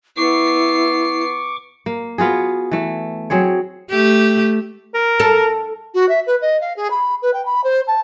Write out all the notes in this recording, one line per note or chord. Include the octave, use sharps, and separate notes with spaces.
B3 E4 C#6 D6 C7
A#3
B3 F4 F#4 G#4
E3 A3
F#3 C4 G#4 C#5
A3 G4
A#4
A4
F#4
E5
B4
D#5
F5
G#4
B5
B4
G5
B5
C5
A5